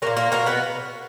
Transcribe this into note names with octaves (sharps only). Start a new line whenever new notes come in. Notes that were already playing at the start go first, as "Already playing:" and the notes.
A#2 F#3 A#3 A#4
A#3 A#4
B2 F#3 A#3 A#4
B3 B4